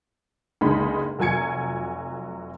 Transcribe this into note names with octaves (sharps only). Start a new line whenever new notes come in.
F#1 C#2 D3 G#3 D#4 B5
F1 F#3 F4 G#5 G#6 C#7